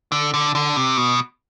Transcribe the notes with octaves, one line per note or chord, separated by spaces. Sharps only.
D3
D3
D3
C3
B2